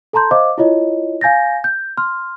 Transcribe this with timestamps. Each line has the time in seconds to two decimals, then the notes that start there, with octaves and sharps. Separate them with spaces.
0.13 A4 A5 A#5 C6 G6
0.31 C5 D#5 F5 D6
0.58 E4 F4 C#5 D#5
1.21 F5 G#5 G6 A6 A#6
1.64 G6
1.97 C6 F6